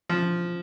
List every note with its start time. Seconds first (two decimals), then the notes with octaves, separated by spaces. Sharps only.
0.10 F3